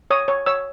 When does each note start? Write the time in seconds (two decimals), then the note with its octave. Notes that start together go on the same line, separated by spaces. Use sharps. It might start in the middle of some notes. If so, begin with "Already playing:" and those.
0.11 C#5 D#6
0.28 C#5
0.46 C#5 E6